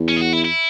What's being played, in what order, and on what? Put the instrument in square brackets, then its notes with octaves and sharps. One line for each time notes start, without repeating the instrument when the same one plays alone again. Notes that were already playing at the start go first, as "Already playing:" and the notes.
Already playing: [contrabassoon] E2
[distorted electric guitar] C#4
G#4
F#4
E4
E4